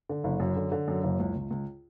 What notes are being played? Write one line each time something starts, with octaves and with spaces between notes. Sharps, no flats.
D3
F#1
F#2
D3
D3
F#2
F#1
C#2
C#2
C#2